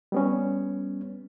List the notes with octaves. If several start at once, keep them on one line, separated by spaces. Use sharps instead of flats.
G3 B3 C#4